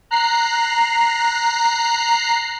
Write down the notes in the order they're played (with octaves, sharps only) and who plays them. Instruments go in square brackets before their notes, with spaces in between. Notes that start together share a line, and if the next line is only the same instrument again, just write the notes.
[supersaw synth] A#5 F#6 C7